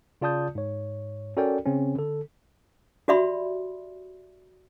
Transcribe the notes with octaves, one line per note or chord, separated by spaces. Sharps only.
C#3 F4 D5 A5 D#6 G6
G#2 C#5
C#4 F#4 A4 A#4 D5 G5
C#3 C4 C#4
D3 A4
F#4 G4 D5 E5 B5 C6